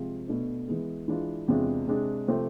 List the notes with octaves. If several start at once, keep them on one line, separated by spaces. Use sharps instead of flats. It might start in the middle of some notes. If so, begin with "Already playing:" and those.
Already playing: C3 F3 G#3 F4
B2 A3 D4
E3 G#3 B3
E3 G#3 D4 F4
E2 C3 G#3 D4 F4
C3 G#3 D4
C3 F3 A3 C4